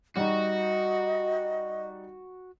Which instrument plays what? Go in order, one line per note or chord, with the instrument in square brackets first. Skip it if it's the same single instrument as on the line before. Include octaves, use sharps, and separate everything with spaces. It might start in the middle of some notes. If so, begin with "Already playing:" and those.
[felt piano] G3 D#4 [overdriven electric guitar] F#4 [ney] D#5